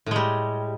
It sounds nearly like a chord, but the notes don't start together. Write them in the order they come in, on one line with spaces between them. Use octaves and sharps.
A2 G#3 G3